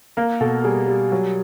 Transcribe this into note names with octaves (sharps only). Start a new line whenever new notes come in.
A#3 A#4
B2 A4
G3 G#4
G3
F#3